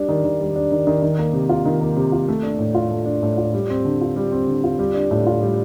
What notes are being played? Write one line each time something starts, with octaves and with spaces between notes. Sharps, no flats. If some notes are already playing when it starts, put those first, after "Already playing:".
Already playing: G3 D4
D#3
D#3
G3
D4
D#3
D#3
D#3
A#3
C3
F4
D#3
A#3
C3
F4
A3
D4
A2
F4
A3
D4
A2
F4
G3
C4
D3
F4
G3
C4
D3
F4
G3
D4
A2
F4
G3